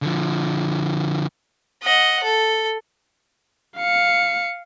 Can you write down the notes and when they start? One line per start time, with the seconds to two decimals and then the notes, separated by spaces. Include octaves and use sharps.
0.02 D3 F3
1.83 D#5 F#5
2.24 A4
3.77 F5 C#7